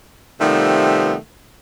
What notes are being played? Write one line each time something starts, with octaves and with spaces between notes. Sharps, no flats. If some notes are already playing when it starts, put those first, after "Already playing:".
C3 D#3 F3 G3 A3 B3